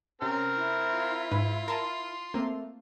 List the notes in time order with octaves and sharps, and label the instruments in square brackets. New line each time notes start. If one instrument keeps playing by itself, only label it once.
[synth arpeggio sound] C3 C#4 [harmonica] C4 A#4 F6
[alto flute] E4
[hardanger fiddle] F4
[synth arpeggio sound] G#2 B4
[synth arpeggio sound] A#4 A5 [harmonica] C6
[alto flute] A3 [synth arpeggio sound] A#3 C4